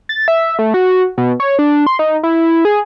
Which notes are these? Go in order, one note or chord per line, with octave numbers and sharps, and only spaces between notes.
A6
E5
A3
F#4
B2
C#5
D4
C6
D#4
E4
G#4